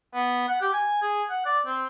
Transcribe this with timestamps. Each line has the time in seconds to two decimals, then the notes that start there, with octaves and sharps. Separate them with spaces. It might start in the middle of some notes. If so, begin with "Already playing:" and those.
0.14 B3
0.48 F#5
0.61 G4
0.73 G#5
1.02 G#4
1.30 F#5
1.45 D5
1.66 C4